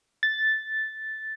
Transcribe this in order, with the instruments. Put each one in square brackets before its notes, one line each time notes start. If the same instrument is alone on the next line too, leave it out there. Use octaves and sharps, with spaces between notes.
[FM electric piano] A6